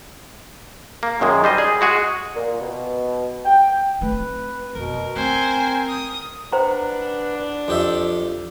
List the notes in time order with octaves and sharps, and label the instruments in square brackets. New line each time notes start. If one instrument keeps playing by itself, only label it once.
[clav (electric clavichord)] A#3
F#2 D#3 G#3
G3 C5 D#5
G#4
G#3 F#4 G#4
[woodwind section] A#2
B2
G5
[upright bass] A3 C4 [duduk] B4
[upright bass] F2 [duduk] B2 [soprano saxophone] A#4
[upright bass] A3 [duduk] C4 [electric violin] C5 G#5
[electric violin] D#6
[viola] D4 [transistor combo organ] B4 F#5 [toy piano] C5 G5 A#5
[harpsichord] F2 G4 E5 [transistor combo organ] F3